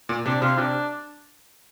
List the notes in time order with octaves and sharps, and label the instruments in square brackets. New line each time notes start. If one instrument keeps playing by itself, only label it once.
[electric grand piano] A#2
[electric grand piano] C3 [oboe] D4
[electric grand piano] C3 [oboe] F4
[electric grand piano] C3 [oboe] D4